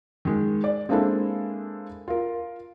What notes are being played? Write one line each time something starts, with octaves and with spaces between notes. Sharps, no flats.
D#3 G#3
D5
G#3 A#3 C4 D4 E4 A4
F4 A#4